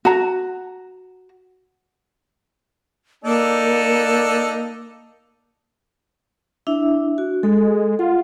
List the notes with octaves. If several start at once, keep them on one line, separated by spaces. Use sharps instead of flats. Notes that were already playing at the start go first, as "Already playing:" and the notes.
F#4 A#5
A#3 D4 D#4 A4
D4 E4 E5
F#4
G#3 A4
F4 F#5